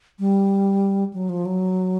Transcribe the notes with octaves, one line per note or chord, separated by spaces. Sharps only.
G3
F#3
F3
F#3